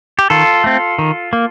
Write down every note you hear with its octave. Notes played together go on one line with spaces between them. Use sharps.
G4
D#3 F4 A4
A3 C4
D#3
A#3